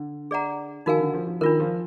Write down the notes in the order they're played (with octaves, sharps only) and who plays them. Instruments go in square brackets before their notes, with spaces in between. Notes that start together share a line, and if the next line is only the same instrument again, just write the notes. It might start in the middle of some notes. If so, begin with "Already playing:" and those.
Already playing: [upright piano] D3
[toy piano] G#4 D5 F#5 A#5
[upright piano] D#3 [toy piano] D#4 F#4 A#4 F5 G#5
[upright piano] D3
F3
F3
[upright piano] D#3 [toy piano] D4 F4 A#4
[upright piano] F3